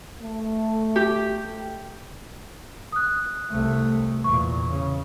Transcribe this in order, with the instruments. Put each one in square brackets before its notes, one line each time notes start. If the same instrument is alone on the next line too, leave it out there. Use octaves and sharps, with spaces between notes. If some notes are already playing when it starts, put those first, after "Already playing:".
[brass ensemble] A3
[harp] G4
[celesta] D#6 F#6
[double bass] C2 A3
[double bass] E2 A#2 [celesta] C#6
[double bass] C#3